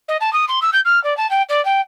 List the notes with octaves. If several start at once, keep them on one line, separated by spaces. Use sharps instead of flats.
D#5
A5
D#6
C6
E6
G6
F6
D5
A5
G5
D5
G5